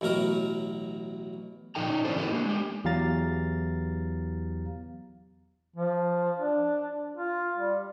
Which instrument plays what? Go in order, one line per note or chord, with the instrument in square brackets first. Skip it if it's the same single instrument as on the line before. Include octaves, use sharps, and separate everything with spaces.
[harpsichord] A1 B2 F#3 A#4 A#5
[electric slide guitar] A#2 F3 D#4 A4 G5 A#5
C#4 D#4
E3 B3 D4 E4 A4 C5
B3 D#4 E4 G4 A4 A#4
A#3 D4
G#3 G4
[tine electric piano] E2 F#3 G4 F5 A#5 A6
[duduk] F3
D4
F4
G3